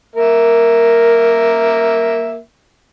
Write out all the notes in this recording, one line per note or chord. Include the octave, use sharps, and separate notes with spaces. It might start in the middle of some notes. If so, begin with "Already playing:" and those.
A#3 A#4 E5